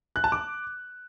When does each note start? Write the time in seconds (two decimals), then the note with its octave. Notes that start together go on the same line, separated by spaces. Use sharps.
0.16 F#6
0.24 A5
0.32 D6